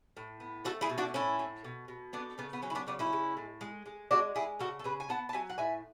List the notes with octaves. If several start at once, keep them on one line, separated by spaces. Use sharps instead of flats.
A2
B3
A3 F#4 A4
E4 G#4
B2
D4 F#4
A2 C#4 E4
A2
B2
B2
A3 B3 D4
C#3 B3
B3
F#3 C#4
E4
B3 D4
C#3 B3 D4
C#4 E4
G#3
A2
G#3
G#3
G#3 D4 F#4
G#3 E4 G#4
C#3 F#4 A4
A4
C#3 G#4 B4
G#5
B3 F#5 A5
A5
F#3 E5 G#5
F#5
A2 E5 G#5